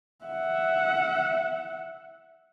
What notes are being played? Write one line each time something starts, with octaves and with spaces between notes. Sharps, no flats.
E5 F#5